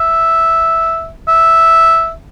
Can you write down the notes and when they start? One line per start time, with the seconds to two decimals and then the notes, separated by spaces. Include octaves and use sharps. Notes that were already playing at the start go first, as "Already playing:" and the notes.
Already playing: E5
1.28 E5